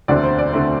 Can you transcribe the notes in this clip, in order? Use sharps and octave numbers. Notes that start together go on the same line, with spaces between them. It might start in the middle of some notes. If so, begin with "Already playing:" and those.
E1 D2 D3 A3 C4 D5
C5
D5
D3 A3 C4